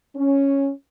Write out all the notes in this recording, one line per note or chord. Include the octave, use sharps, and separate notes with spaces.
C#4